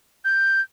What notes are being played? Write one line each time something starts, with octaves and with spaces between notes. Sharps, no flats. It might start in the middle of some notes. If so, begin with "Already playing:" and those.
G6